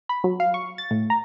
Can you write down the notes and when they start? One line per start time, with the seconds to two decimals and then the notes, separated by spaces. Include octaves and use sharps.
0.09 B5
0.24 F#3
0.40 F5
0.54 C#6
0.78 A6
0.91 A2
1.10 A#5